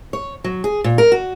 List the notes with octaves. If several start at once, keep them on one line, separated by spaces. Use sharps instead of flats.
C#5
F#3
G#4
A#2
A#4
F#4